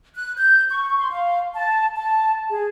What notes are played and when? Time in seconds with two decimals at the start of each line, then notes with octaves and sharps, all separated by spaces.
0.15 F#6
0.37 G6
0.70 C#6
0.99 C6
1.11 F5
1.54 A5
1.96 A5
2.50 G#4